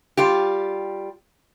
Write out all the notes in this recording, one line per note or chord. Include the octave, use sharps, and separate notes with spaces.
G3 F4 G4